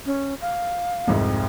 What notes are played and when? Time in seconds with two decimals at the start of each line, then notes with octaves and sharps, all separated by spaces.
0.06 C#4
0.41 F5
1.07 C2 F2 G#2